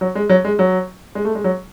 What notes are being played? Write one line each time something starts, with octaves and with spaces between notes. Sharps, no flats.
F#3
G#3
F#3
G#3
F#3
G#3
A3
G#3
F#3